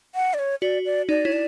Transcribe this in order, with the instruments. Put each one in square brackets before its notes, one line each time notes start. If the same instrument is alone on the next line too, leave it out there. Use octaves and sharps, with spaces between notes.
[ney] F#5
D5
C#5
[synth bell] F#4 [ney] D5
[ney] D5
[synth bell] D#4 [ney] D5
[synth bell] E4 [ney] C#5
[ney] D5